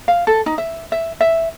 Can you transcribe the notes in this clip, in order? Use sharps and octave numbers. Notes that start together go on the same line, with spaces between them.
F5
A4
D#4
E5
E5
E5